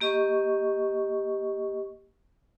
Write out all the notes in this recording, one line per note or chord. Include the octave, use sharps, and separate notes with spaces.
A#3 G4 D#5 C#6